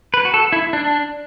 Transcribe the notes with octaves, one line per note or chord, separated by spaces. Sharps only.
B4
F#4
A4
E4
D4